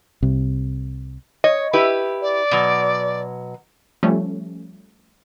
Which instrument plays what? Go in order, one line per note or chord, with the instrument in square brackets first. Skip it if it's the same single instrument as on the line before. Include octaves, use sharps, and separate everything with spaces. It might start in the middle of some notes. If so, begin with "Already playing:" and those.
[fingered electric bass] C2 C3
[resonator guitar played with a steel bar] C#5 [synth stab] D#5
[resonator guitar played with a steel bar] E4 G4 B4
[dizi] D5
[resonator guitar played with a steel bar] B2 F#3
[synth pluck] F3 G3 A3 C#4